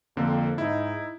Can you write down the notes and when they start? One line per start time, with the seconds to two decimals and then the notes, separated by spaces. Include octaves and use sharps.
0.17 F2 D3 A#3 C4
0.58 G#2 D#4 E4